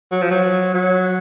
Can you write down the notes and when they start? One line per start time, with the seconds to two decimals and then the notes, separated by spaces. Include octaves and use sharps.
0.12 F#3
0.22 F3
0.31 F#3
0.74 F#3